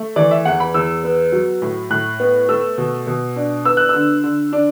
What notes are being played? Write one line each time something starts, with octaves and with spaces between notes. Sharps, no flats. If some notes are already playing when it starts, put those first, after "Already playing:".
Already playing: A3
E3 D5
E5
E2 F#5
B5
E2 E6
B3
F#3
A2
A2 F#6
B3
A3 E6
B2
B2
D4
B3 E6
F#6
D3 E6
D3
D4